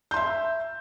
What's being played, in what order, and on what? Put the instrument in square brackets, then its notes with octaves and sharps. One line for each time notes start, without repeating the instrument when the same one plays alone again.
[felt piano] G6
C6
E5